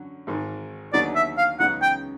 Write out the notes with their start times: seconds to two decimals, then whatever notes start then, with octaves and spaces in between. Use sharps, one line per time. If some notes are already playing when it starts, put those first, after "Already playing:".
Already playing: F#2 D3 F#3
0.27 G#1 G#2 D#3
0.93 D#2 D3 F#3 B3 D#4 D5
1.15 E5
1.38 F5
1.59 C#2 C#3 F#3 B3 D#4 F#5
1.82 G5